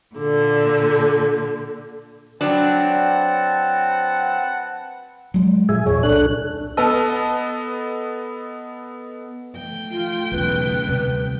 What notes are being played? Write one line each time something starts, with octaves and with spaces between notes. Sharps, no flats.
A#2 D3
F#3 C4 D4 B4 F#5 A5
F#3 G#3
A#2 F#3 G#4 E5 G#5
E2 A#2 C#5
C2 D4 A4 F#6
B3 A4 B4 D#5 A5 E6
A3 G5
F4
B1 E2 C#3 B4
D2 C3 G3